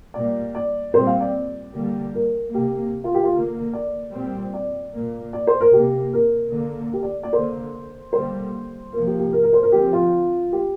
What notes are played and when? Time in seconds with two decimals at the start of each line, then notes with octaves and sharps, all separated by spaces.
0.14 A#2 G3 A#3 D5
0.55 D5
0.94 A#2 G3 C4 C5
1.07 F5
1.20 D5
1.74 D3 G3 A#3
2.14 A#4
2.53 C3 A#3 G4
3.04 F4
3.14 G4
3.24 F4
3.34 D3 A#3
3.73 D5
4.13 A#2 G3 C4
4.54 D5
4.93 A#2 A#3
5.33 D5
5.47 C5
5.61 A#4
5.73 C3 A#3 G4
6.13 A#4
6.53 D3 A#3
6.93 G4
7.03 D5
7.23 D5
7.33 D3 A#3 C5
8.13 D3 G3 A#3 C5
8.93 C3 F3 A#3 A#4
9.07 G4
9.19 G4
9.33 A#4
9.43 A#4
9.53 C5
9.63 A#4
9.72 D3 F3 C4 G4
9.93 F4
10.52 G4